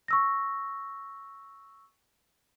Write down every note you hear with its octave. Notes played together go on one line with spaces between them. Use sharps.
C#6 E6 A#6